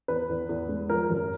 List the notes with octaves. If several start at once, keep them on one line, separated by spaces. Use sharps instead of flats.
E2 B4
E2
E2
G#3
F3 A#4
F#2